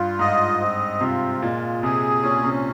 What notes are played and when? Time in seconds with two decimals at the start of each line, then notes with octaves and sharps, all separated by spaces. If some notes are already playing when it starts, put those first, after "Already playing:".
Already playing: G2 F4
0.19 G#2 D#5
0.60 C4
1.01 C3 F4
1.42 A#2 G#3
1.83 C3 G#4
2.23 A#2 C#4
2.44 C3